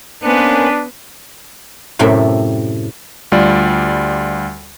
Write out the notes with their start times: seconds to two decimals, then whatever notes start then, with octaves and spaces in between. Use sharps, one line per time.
0.24 A#3 B3 C#4 D4 B4 C5
1.99 F#2 A2 C3 A4 E5 G5
3.32 D2 G3 F4 D5